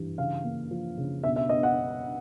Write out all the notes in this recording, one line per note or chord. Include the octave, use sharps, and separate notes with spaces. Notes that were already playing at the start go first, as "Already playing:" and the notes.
Already playing: G2 E3
C#3 F5
A#3
F3
C#3
B2 E5
E5
B3 D#5
F#5